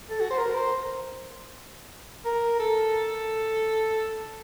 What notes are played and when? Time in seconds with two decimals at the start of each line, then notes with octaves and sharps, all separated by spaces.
0.10 A4
0.20 F#4
0.30 C5
0.38 A#4
0.55 C5
2.25 A#4
2.59 A4